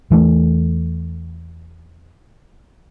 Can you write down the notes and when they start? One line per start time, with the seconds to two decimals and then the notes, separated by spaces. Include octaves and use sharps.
0.11 E2 E3 G#3 A3